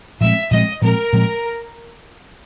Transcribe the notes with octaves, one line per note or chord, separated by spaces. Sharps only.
A#2 F3 G#3 C4 E5
A#2 F3 G#3 C4 D#5
A#2 F3 G#3 C4 A#4
A#2 F3 G#3 C4